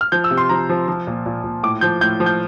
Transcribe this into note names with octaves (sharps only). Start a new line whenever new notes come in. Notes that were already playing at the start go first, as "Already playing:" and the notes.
F6
F3 G6
E6
C3
C6
F3 A#5
F3
F3
A#2
A#2
A#2
A2 D6
F3 G6
A2 G6
F3
G6